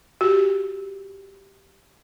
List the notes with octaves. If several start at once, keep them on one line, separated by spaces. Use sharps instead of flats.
F#4 G4